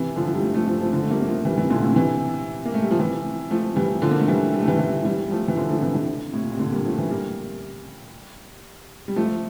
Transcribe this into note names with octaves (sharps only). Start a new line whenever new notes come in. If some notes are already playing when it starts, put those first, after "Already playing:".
Already playing: C3 E3
D3 F3
F3
G3
F3 A3
F3 A3
F3 A3
F3 A3
D3 F3
A3
G3 A#3
A#3
F3 A3
E3 G3
C3 E3
A#2 D3
A2 C3
C3 E3
A#3
A3
G3
F3
C3 E3
F3 A3
E3 G3
D3 F3
A#3
A3
E3 G3
G3
A3
E3 G3
E3 G3
E3 G3
G3
F3 A3
E3
D3 F3
D3 F3
C3 E3
C3 E3
A2 C3
A#2
C3
A#2 D3
G3 A#3
F3 A3
E3 G3
G3 A#3
G3
F3 A3